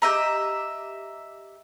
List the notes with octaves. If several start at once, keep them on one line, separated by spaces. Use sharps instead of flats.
G4 D#5 E5 A#5